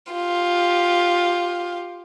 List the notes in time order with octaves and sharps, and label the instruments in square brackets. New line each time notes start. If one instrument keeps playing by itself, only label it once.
[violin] F4 G4